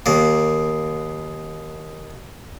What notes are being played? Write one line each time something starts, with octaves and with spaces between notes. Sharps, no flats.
D#2 A#3